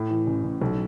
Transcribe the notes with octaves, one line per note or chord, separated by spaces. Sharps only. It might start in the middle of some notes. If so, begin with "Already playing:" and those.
Already playing: A2
E3
A1
A1
B1